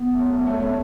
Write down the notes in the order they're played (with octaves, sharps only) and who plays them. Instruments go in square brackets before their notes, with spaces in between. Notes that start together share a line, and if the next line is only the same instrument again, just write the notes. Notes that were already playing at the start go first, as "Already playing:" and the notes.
Already playing: [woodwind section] B3
[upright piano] A3
[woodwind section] E2 [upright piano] F#3
[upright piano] A3
[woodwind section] E2 [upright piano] A3 C#4
[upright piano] A3 C#4